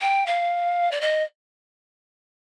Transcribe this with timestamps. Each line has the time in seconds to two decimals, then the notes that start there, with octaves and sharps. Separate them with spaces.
0.01 G5
0.26 F5
0.91 D5
1.01 D#5